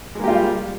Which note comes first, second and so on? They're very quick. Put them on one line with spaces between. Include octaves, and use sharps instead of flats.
G#3 A#3 G4 F4 G3